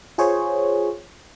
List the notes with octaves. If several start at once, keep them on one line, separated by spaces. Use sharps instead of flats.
F4 G#4 C5 C#5